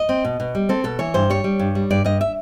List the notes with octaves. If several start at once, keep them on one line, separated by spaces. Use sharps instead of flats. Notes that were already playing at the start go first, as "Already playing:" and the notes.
Already playing: D#5
C4
B2
B2
G3
C4 A4
B2 A4
E3 C#5
G2 C5
G3 C#5
G3
G2
G3
G2 D5
G2 D#5
E5